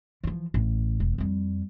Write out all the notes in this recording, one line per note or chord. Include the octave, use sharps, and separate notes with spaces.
E3 F3
A1
E1
F2 G3